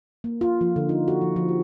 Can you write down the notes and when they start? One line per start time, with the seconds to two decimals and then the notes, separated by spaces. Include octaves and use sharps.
0.24 A#3
0.41 F4
0.61 F3
0.76 D3
0.89 D#4
1.08 F#4
1.21 F3
1.36 F3
1.49 G4